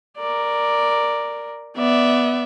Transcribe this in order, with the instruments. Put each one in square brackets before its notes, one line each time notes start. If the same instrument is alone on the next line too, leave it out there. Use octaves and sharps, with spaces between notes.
[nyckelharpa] A#4 D5
[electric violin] B3 E5 [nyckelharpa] D5